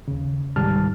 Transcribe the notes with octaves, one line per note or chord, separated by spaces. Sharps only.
D#2 C#3
C2 G#2 D#3 G3 A5 F6